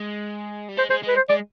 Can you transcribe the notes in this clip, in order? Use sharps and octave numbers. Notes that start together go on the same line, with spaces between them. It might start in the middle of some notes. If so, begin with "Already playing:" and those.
Already playing: G#3
G3
G#3 C5
G#3 C5
G#3 B4
C5
G#3 D5